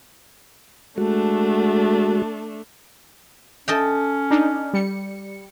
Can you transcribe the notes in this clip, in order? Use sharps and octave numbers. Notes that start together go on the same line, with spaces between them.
G#3 A3 D4 F#4
C#4 A4 D#5 G5
D4 D#4
G3 C#7